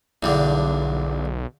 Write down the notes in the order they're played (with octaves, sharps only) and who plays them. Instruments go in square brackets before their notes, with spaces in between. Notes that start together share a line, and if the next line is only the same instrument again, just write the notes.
[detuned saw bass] B1 [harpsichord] E2 G2 D3